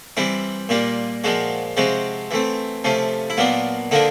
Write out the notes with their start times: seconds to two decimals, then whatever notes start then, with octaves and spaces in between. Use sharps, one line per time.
0.17 E3 G3 C4 E4
0.69 A#2 G3 A#3 F4
1.24 A#2 F3 G#3 F#4
1.77 C3 F3 G#3 C4 F#4
2.31 E3 A3 C4
2.84 C3 F3 A3 C#4
3.30 E4
3.37 A#2 F#3 B3 D4 F4
3.91 D3 F3 A#3 D4 D#4